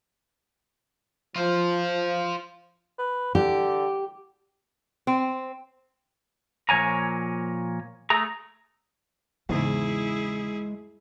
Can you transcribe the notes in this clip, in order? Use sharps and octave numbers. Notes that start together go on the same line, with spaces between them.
F3 F4 C5
B4
D3 G4
C4
A#2 F3 C#5 G#5 A#5
A3 G#4 A#5
E2 G#2 C#3 G#3 E4 G#4